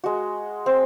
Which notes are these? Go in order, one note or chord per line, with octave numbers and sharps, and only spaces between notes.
G#3 F#4
C4